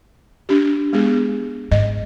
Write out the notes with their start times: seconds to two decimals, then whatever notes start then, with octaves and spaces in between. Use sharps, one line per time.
0.49 D4 G4
0.93 G#3 B3 G#4
1.71 G#2 D#5